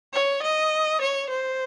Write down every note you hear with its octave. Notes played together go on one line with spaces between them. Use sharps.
C#5
D#5
C#5
C5